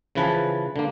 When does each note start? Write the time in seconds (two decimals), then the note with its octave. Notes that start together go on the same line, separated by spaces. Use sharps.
0.15 C#3 E3 F3 B4 G#5 A5
0.76 D3 A#3